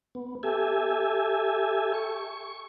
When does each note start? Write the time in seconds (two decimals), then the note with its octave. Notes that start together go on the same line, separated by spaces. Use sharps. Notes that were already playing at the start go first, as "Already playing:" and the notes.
0.15 B3
0.43 G4 A4 E5 G#5
1.94 C#6